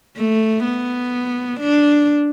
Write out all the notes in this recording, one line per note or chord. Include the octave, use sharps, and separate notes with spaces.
A3
B3
D4